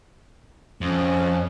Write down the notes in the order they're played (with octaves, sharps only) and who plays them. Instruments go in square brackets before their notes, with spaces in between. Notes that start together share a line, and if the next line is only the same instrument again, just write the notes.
[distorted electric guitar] F2 [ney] C#4